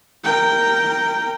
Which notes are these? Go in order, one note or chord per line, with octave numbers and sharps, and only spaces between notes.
A#4 G5